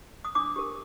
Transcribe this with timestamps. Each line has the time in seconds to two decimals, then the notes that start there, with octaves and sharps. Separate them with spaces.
0.25 D#6
0.35 D4 D6
0.56 G4 A#4